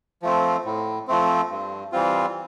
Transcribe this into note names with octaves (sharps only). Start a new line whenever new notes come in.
F3 A3 C4
A2
F3 A3 C4
G2
E3 G3 C4 F4